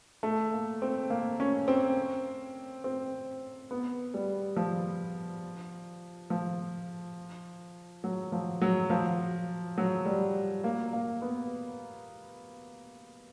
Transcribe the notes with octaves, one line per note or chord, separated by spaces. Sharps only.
A3
A#3
C4
A#3
C#4
C4
C4
B3
G3
F3
F3
F#3
F3
F#3
F3
F#3
G3
A#3
A#3
B3